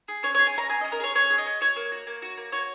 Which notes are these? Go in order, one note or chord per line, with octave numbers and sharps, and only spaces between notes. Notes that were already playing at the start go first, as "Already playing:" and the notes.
G#4
C#4 C#5
G#4 C#5
G#5
C#4 A#5
G#4 G#5
C#4 D#5
A#4
G#4 C#5
C#4 C#5
G#4
D#5
C#4
F#4 C#5
A#3
F#4
A#3
F#4
A#3
F#4 C#5